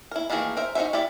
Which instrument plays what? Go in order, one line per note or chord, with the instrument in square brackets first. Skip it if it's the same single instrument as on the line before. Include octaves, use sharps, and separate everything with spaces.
[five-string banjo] E4 A#4
D#3 E3 A3 A#3 G#4
A#4 C5 E5
D#4 F#4 A4 C5 E5
E4 G4 D5 E5